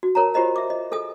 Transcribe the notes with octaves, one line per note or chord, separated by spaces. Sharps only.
F#4
A#4 C#5 A5 A#5
F4 G4 C5 D#5 A#5
E5 D6
D#5
G#4 A4 G#5 D#6